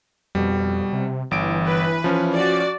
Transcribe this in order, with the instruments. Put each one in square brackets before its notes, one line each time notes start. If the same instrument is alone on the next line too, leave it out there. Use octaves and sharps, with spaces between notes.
[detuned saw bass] F2 [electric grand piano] B2 G3
[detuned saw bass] C3
[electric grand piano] G1 D7 [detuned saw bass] E3
[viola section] B4
[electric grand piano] F3 C#4
[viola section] F#4 D5